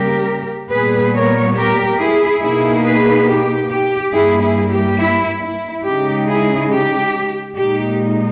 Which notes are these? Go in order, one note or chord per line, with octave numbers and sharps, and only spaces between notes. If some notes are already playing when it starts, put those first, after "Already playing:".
Already playing: C#3 G3 A#3 G4 A#4
A#2 G3 B3 G#4 B4
A#4 C#5
G4 A#4
E4 G#4
B2 A#3 D#4 E4 G#4
G#4 B4
G4
G4
G2 G3 A#3 E4 G#4
E4 G#4
G4
E4
E4
C#3 G#3 D#4 G4
E4 G#4
G4
A#2 G#3 D#4 G4